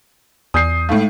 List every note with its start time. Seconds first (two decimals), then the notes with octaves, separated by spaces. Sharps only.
0.54 E2 D5 G#5 D#6 G6 C7
0.89 A2 G#3 A3 D#4 F5